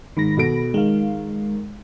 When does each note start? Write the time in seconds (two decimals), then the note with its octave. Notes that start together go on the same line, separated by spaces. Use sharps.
0.17 G#2 D#3 B5 A#6
0.37 B2 A4 D7
0.74 D#3 G#3 F5